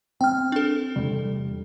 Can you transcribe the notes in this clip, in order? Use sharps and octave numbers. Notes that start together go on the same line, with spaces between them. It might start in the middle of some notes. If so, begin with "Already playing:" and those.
C4 G5 F6
D4 A4
E2 C3 G3